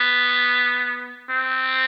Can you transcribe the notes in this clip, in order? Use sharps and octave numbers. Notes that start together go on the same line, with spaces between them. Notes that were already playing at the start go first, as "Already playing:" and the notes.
Already playing: B3
C4